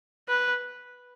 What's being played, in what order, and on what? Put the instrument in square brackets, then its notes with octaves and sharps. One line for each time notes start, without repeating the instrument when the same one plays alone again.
[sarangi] B4